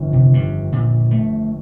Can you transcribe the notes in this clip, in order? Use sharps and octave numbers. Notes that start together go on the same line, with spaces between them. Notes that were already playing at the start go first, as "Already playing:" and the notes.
Already playing: G1 F2 D#3
C3
G2
A#2
A3